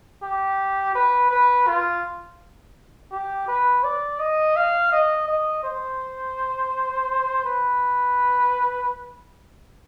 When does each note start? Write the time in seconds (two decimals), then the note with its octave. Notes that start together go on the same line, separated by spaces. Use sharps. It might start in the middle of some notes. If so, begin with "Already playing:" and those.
0.23 G4
0.95 B4
1.31 B4
1.68 F4
3.12 G4
3.48 B4
3.84 D5
4.20 D#5
4.56 F5
4.92 D#5
5.28 D#5
5.64 C5
7.45 B4